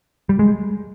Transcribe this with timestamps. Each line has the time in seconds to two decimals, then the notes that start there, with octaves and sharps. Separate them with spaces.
0.29 G3
0.39 G#3